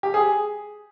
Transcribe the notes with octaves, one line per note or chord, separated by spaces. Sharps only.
G4
G#4